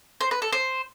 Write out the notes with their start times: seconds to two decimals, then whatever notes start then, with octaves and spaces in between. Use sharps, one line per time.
0.21 C5
0.31 B4
0.42 A4
0.52 C5